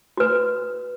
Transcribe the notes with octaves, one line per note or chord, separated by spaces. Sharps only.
F#4 B4